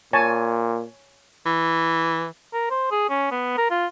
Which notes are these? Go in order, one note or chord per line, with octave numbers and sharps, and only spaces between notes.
A#2 C#5 G#5 A5
E3
A#4
C5
G#4
C#4
B3
A#4
F4